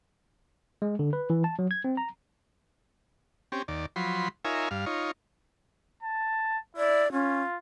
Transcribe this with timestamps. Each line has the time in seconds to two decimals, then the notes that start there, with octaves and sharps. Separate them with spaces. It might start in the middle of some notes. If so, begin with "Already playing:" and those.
0.82 G#3
0.99 D3
1.13 B4
1.30 E3
1.44 A5
1.59 F#3
1.71 G#6
1.84 C4
1.97 A#5
3.52 C4 C#4 G4
3.68 D#2 D5
3.96 F3 F#3 B5 C6
4.45 D#4 F4 A#4 C#5 E5 G#5
4.71 G2 F5
4.86 D#4 F4 C#5
6.03 A5
6.77 E4 D5
7.12 C#4 F4